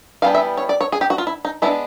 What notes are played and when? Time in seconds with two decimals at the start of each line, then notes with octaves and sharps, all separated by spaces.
0.22 E3 G3 B3 D4 F5
0.35 E5
0.57 C#5
0.69 D5
0.81 C#5
0.92 G#4
1.01 G4
1.10 F#4
1.18 F4
1.27 E4
1.45 D#4
1.62 G#3 B3 D4 E4